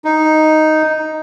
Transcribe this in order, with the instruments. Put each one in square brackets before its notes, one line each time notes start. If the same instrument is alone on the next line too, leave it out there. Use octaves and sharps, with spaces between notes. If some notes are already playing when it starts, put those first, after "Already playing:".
[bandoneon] D#4